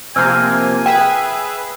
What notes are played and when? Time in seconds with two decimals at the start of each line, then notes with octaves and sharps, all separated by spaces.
0.16 C3 F3 A#3 G#5 E6 F6 G6
0.86 G#4 B4 E5 G5